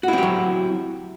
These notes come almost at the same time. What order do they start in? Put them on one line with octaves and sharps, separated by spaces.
F#4 E4 C4 G4 F#3